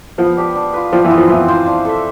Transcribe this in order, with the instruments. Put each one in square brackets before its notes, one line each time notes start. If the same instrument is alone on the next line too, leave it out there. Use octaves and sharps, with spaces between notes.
[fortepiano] F3 [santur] B3
[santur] D4 G4 B4
D4
F4 B4
[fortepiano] F3 [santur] G3
[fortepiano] E3
[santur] B3 F4
[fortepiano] F3
[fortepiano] E3 [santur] C4
[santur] F4 C5 F5
D4
A4 E5